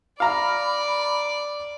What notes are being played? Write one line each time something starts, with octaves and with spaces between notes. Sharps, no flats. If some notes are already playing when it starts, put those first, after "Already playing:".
D5 F5 A#5 B5 F6